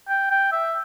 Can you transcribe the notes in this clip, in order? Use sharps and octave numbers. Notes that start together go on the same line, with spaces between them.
G5
G5
E5